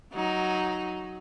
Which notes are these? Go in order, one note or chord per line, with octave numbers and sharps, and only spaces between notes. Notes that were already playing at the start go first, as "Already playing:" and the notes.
F#3 D#4